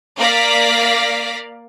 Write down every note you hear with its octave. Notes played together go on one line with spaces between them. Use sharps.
A#3 D5 F5 A#6 B6